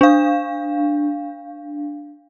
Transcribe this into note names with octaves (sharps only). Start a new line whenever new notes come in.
D4 F5